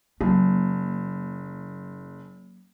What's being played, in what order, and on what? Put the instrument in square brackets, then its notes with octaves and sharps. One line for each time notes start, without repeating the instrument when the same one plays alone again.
[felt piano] F#1 [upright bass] F#3 A#3